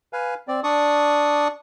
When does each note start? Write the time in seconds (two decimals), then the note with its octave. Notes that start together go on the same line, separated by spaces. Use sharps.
0.13 B4 F5 G#5
0.48 C4 D5
0.64 D4 D5 C#6 D#6